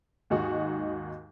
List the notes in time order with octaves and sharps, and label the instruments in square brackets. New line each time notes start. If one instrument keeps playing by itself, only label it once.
[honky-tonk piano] D#2 G#2 D#4 F#4